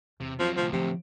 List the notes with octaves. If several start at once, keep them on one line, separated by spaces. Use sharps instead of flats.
E2 C3
F3 F#3 C4
D2 A2 C3 F3
C3 F3